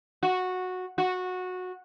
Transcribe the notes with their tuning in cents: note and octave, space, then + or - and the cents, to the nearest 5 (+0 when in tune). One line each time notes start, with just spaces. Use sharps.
F#4 -10
F#4 -15